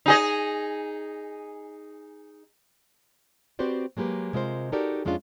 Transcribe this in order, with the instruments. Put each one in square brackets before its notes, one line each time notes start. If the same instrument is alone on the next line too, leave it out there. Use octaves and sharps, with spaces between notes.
[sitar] D#4 G#4 D#5
[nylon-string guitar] C4 F#4 G4 B4 C5 D5
F#3 G#3 A#3 G4 B4
C3 G#3 F4 A#4 C5
D#4 F#4 G4 A4 A#4 D5
F2 G#3 C#4 D4 F4